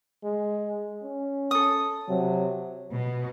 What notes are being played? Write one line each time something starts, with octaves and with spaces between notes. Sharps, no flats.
G#3
C#4
A4 D#6
C3 F#3
B2